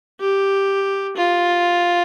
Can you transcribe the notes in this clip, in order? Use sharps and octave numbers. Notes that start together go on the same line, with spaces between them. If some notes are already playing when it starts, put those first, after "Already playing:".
G4
F4